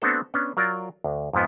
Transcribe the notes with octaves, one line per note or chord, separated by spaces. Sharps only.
A3 B3 C4 D4 F#4 A4
B3 C#4 D4
F#3 F4 A#4 D5
D2
F2 G#2 F3 B3